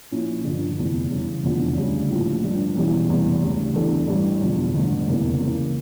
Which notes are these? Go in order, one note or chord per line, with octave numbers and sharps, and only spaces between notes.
A#1 A#2 F3 C#4 E4
G1 G2 D3 F3
F1 E2 E3
C#3 E3 G3
F1 E2 D3 F3
D2 C#3 G3 D4 G4
A#1 A2 F3
G1 G2 F3
E1 E2 E3 G3 C#4
F1 E2 E3 G3
D2 C#3 G3
E2 E3 G3 D4 A4
A1 G2 E3 G3
E1 E2 D3 F3
A1 G2 D3
F1 E2 C#3 E3 A#3
C#2 C#3 E3 A#3